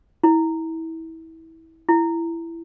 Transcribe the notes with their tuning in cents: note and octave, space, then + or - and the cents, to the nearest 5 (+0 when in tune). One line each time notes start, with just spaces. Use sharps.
E4 -25
E4 +15